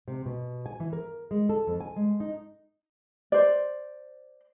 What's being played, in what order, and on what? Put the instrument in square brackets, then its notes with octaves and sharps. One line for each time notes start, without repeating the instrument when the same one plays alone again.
[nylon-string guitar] C3
B2
G#5
E3
A#4
G#3
A4
F2
G#5
G#3
D#4
[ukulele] C5 D5